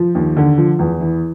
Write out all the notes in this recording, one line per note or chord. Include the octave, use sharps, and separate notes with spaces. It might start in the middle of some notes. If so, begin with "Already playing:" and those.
Already playing: F3
D#2
D3
F3
E2
E3